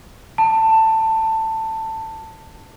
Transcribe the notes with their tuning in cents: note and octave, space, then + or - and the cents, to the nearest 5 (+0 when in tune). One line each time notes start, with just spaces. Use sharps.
A5 +15